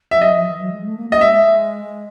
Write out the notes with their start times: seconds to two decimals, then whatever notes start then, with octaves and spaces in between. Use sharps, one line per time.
0.11 F3 E5
0.21 F#3 D#5
0.34 F3
0.47 E3
0.59 F#3
0.72 G#3
0.84 A3
0.96 A#3
1.09 A#3 D#5
1.21 G#3 E5